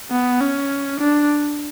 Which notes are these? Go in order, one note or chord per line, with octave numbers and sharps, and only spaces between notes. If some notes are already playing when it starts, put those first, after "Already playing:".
B3
C#4
D4